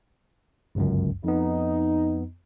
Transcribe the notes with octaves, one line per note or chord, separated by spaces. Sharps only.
G1 C#2 F#2
F2 B3 D#4